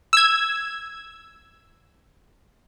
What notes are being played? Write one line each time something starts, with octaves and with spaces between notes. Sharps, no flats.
E6 G#6